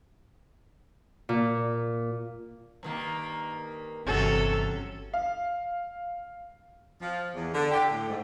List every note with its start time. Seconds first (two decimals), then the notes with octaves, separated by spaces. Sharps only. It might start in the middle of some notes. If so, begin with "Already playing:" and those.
1.29 A#2
2.83 G2 D#3 A#3
4.07 G1 C3 E3 F#3 C#4 F#4 A4
5.13 F5
7.02 F3
7.35 E2
7.54 D3
7.71 G4
7.91 A2
8.09 G#2